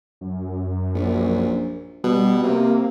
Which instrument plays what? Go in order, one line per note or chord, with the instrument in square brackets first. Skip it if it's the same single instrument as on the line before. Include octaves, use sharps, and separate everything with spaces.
[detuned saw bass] F#2
[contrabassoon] A#1
[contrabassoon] B2 [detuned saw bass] G3
[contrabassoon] C3 [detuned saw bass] A#3